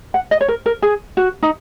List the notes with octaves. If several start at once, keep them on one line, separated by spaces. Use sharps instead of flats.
F#5
D#5
C#5
A#4
A#4
G#4
F#4
D#4